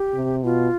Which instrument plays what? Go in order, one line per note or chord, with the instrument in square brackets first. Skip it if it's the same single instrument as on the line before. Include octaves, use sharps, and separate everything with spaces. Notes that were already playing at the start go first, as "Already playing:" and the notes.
Already playing: [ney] G4
[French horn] C3
[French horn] B2 [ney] F4